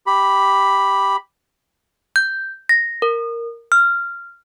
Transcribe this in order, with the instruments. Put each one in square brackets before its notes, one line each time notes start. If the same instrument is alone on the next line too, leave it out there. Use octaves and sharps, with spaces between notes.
[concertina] G4 B5
[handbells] G6
A#6
A#4
F6